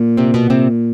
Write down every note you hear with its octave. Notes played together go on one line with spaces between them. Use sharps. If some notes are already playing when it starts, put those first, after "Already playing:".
Already playing: A#2
C3 C4
B2 B3
C3 C4